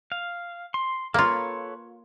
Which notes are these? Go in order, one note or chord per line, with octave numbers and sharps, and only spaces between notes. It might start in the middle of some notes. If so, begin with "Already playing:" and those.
F5
C6
A#3 F4 A4 B4 C#5